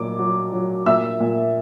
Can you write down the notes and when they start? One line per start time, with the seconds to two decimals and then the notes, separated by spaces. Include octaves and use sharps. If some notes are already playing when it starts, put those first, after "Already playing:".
Already playing: A#2 F#3 D6
0.19 F#3
0.53 F#3
0.86 A#2 E5 E6
1.20 A#2